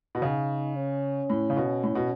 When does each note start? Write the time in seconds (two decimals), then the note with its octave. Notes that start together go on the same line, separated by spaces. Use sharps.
0.15 B2
0.22 C#3 D#4
0.76 C#4
1.30 A2
1.50 C#3
1.57 B2
1.84 A2
1.95 B2